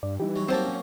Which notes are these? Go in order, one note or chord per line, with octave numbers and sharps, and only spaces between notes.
G2 D5
E3 G3 D#4 G4
F#3
F#3 A#3 C4 C5 A5
C#4